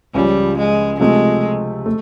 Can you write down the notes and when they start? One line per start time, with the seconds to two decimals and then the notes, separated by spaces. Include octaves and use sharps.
0.14 C#2 C#3 F3 G3
0.58 G#3
1.00 C3 F3 G#3 A3
1.86 A3